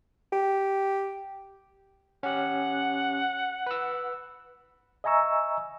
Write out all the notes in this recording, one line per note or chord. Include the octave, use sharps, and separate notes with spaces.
G4
C#4 G4 F#5
B4 E6
D#5 E5 G#5 A#5 C#6 E6